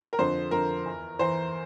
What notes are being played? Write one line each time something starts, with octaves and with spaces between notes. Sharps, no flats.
A#4
F2 D3 C5
F2 D3 A#4
E2 E3
E2 E3 C5